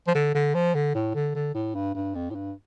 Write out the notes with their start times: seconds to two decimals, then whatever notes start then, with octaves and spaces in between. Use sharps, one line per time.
0.07 F3
0.14 D3
0.34 D3
0.54 F3
0.75 D3
0.95 A2
1.14 D3
1.35 D3
1.55 A2
1.75 G2
1.95 G2
2.15 F2
2.30 A2
2.35 G2